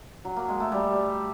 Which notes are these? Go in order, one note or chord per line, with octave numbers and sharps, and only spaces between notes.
F#3
A#3
G#3
A3
G3